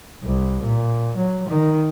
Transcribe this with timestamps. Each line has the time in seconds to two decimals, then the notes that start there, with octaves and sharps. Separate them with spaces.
0.23 C2
0.64 A#2
1.17 F#3
1.48 D#3